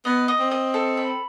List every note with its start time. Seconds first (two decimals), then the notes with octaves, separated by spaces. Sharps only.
0.05 B3 D#5
0.28 D#5
0.39 C4
0.51 D#5
0.74 A4
0.97 B5